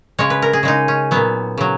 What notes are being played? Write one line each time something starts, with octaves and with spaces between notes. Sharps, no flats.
C#3 G#3 C#5
B4
A#4
G#4
C#3 G#3 D#4
C#4
A#2 F#3 B3
C#3 F#3